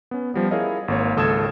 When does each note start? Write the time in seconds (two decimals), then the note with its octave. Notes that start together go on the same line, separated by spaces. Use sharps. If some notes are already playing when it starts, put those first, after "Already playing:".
0.11 B3 C#4
0.34 F3 G3 B3
0.51 E4 G#4 A#4 C#5 D#5 F5
0.88 G#1 A#3 C#5
1.16 G#1 C#2 A4 D#6 G#6 E7